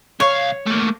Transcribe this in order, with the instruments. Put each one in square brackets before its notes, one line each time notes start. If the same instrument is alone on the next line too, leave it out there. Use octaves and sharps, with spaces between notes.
[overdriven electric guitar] C2 F5 [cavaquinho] C#5
[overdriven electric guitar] A3 A#3